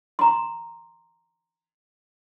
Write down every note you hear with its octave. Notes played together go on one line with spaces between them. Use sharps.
A#5 C6